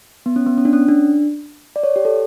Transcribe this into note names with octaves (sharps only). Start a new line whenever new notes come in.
B3
C#4
B3
C#4
D4
C#4
D4
D5
C#5
G4
A4